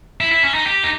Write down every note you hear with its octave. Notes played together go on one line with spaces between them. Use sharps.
E4
E4
C#4
D#4
G4
D#4